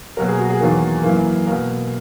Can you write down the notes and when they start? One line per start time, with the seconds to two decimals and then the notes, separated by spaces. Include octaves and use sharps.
0.17 B2 F#3 A#3 A#4
0.28 G#4
0.39 F#4
0.50 G#4
0.60 E2 D#3 F#3 A#3
1.03 F#2 E3 A#3
1.47 B2 A#3 A#4